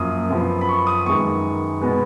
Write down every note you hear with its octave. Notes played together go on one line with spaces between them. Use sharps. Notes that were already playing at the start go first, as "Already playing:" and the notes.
Already playing: F#2 F3 A#3 D#6
F#2 F3 B3
B5
C#6
D#6
F#2 D#3 G#3 B3 C#6
B2 G#3 B3